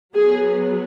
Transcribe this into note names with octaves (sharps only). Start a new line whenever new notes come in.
F#3 B3 G#4